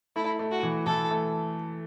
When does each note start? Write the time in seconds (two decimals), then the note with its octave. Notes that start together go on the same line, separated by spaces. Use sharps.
0.16 A3 E4
0.39 A3
0.52 F#4
0.63 E3
0.86 E3 A4
1.11 A3